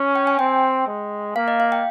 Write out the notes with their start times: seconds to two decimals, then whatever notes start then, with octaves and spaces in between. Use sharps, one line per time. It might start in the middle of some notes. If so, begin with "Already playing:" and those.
Already playing: C#4
0.15 G5
0.27 G#5
0.39 C4 G5
0.87 G#3
1.36 A#3 F5
1.48 D#5
1.60 F5
1.72 G5